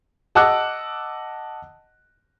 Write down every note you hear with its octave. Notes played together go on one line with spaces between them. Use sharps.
D#5 F#5 A5 D6 E6 F#6